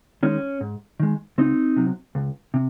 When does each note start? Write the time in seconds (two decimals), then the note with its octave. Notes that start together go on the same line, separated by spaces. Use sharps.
0.23 D#3 G#3 C#4
0.61 G#2
1.00 D#3 G#3
1.38 C#2 C4 D#4
1.76 C3 F#3
2.15 C#2
2.54 C3